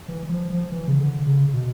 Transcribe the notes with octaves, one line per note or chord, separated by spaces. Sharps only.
E3
F3
F3
E3
C#3
D3
C#3
B2